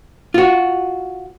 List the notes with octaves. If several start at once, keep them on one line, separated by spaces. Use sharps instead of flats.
F4 F#4